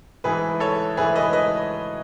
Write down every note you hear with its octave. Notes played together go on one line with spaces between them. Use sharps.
G#2 E3 A3 E4 G#4 B4
A4 C#5
G#2 E3 A3 E4 G#4 B4
B4 D#5
B4 D#5